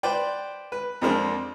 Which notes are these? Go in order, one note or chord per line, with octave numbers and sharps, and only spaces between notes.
B4 C5 D5 G5
B4
F2 F3 G#3 A#3 C4 D4